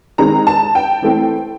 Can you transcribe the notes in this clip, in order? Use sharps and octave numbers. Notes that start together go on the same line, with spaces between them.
D#3 G#3 C4 A#5
A5
G5
E3 A3 C4